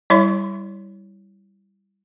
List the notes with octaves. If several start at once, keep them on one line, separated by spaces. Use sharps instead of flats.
G3 E4 C#5 E5 C6